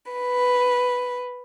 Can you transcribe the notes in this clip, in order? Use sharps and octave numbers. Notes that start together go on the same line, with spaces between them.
B4